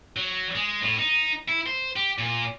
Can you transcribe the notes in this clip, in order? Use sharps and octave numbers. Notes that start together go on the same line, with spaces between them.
F#3
G#3
A2
D#4
E4
C5
G4
A#2